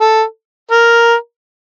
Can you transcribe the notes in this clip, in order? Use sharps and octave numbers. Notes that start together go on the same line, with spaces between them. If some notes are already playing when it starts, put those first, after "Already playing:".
A4
A#4